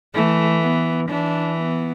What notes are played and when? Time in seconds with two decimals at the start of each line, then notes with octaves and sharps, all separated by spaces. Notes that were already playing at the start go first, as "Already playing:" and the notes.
0.14 E3 A3
0.62 B3
1.09 E3 D4
1.57 B3